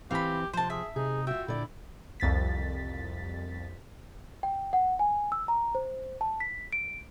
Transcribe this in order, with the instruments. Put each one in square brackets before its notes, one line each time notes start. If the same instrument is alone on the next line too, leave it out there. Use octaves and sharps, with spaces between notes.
[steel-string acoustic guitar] E3 C4 [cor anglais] G4 [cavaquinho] F5 B5
[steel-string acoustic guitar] C3 F3 [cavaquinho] C5 A5
[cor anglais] G#4 [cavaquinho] E5
[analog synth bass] C3 [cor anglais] D#4 [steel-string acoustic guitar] G#4
[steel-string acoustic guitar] F4 F#4 [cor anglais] E5 [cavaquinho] G5
[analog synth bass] A#2 [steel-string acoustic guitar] D3 D5 [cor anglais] E4
[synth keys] C2 F2 A6 B6
[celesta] G5
F#5
G#5
E6
A#5
C5
A5
B6
D7